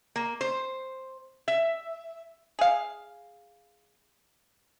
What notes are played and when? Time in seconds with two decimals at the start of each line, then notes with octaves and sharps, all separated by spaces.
0.16 A#3
0.41 C5
1.48 E5
2.59 G#4 F5